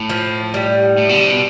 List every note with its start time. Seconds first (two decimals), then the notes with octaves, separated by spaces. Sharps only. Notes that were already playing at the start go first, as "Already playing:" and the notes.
Already playing: A2
0.10 F3
0.54 G3
0.97 A2
1.09 B2
1.15 D3
1.20 C3
1.31 B2